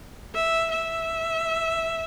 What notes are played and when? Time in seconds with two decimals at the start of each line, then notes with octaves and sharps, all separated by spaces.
0.35 E5
0.71 E5